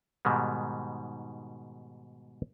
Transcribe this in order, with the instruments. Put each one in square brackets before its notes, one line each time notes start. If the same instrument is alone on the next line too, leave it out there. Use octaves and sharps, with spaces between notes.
[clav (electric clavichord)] G#2 B2 D#3 G3 G#3